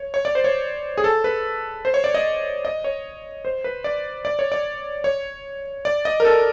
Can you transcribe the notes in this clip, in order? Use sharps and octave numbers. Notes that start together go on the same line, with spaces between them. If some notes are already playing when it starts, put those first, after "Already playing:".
Already playing: C#5
C#5
D5
C5
C#5
G#4
A4
B4
C5
C#5
D5
D#5
D#5
C#5
C5
B4
D5
D5
C#5
D5
C#5
D5
D#5
A#4
A4